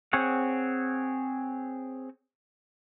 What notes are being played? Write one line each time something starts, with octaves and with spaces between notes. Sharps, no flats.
C4 G#4 C#5 F#5